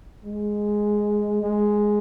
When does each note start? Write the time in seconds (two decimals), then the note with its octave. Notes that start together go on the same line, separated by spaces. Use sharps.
0.25 G#3
1.43 G#3